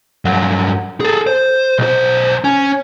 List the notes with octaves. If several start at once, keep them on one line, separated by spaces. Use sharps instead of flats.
G2 F#3
G#4 A4
C5
B1 C5
C#4